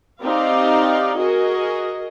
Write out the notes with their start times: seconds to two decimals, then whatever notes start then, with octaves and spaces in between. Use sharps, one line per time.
0.22 C4 D#4 G4 D5 F5 A#5
1.17 F#4 G#4 A#4 D#5